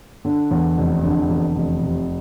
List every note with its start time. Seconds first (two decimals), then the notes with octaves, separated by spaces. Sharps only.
0.25 D3
0.51 E2
0.78 F1
1.03 D3
1.30 E2
1.55 F1
1.82 C3